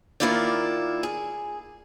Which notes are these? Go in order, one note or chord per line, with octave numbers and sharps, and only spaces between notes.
D#3 A3 A#3 E4 F4 D5
G#4